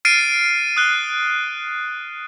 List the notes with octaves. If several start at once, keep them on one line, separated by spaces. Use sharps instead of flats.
F6 A6 C7 D7 D#7
D#6 F#6 G7